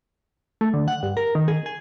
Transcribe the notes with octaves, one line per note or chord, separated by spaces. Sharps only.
A3
D3
F#5
G2
A#4
D#3
G#4
G#4